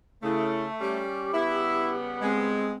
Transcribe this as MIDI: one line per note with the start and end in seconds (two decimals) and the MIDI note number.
0.23 0.65 49
0.23 1.01 57
0.23 0.61 64
0.80 1.33 55
0.80 1.33 61
0.80 1.99 67
1.34 2.73 49
1.34 2.73 55
1.34 2.73 59
1.34 1.92 64
2.22 2.74 56
2.22 2.73 60